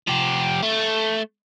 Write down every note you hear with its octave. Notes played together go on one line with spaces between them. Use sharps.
F3 G4
A3